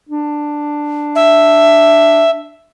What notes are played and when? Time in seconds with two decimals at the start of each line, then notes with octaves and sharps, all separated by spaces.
0.09 D4
1.15 E5